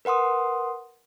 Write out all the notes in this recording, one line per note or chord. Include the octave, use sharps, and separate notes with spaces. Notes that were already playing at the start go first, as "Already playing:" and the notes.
A#4 B4 F#5 C6 D#6